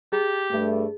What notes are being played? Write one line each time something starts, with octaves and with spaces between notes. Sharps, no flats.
G4 G#4
G2 A3